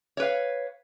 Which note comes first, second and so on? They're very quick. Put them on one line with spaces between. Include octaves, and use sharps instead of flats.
C#5 B4 F5